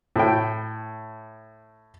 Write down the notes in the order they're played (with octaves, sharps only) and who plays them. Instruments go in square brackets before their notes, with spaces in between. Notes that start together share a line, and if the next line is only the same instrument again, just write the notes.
[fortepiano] A2 G5